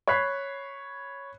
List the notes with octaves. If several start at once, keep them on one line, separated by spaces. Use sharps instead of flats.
C#5 B5 F#6 B6 C7